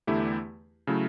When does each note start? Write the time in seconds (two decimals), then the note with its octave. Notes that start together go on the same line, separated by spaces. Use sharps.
0.07 E2 D3 A3 E4 G4
0.87 C#3 F#3 A3 E4